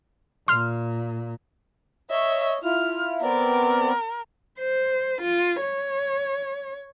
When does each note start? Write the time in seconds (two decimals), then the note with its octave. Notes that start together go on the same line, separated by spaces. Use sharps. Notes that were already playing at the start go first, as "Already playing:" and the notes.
0.48 A#2 C6 F6
2.10 C#5 D#5 E5
2.64 E4 F4 F6
3.22 B3 C4 A#4 D5
4.59 C5
5.22 F4
5.61 C#5